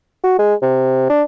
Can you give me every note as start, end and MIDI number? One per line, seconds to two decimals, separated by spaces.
0.24 0.36 66
0.39 0.54 56
0.62 1.09 48
1.10 1.23 62